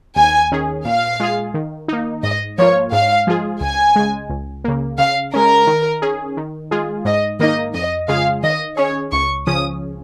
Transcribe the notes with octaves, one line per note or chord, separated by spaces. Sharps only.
D#2 G#5
D#3 C#4 G#4
A#2 F5
G#3 F4 G#4
D#3
A#3 D#4
G#2 D#5
F3 A#3 F4 C#5
G#2 F5
F3 G#3 F4 G#4
C#2 G#5
C#3 G#3
C#2
C#3 A#3
C#3 F5
G#3 C#4 A#4
D#3
C#4 G#4
D#3
G#3 F4 G#4
G#2 D#5
D#3 A#3 D#4 D#5
F2 D#5
C#3 G#3 F4 G#4 F5
D#3 D#5
C#4 G#4 C#5
C#2 C#6
C#3 F3 C#4 D#6